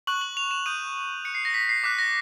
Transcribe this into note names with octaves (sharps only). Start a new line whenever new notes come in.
C#6 F#6 F#7
F#7
F7
E7
D#6 G6 D#7
C#6 F#6 C#7
C7
A#6
B6
C7
D6 F#6 B6
A#6